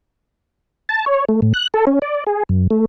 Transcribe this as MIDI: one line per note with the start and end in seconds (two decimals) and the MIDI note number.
0.89 1.05 81
1.06 1.25 73
1.29 1.40 57
1.42 1.53 45
1.54 1.68 90
1.74 1.85 69
1.87 1.99 61
2.02 2.24 74
2.27 2.43 68
2.49 2.67 42
2.70 2.85 57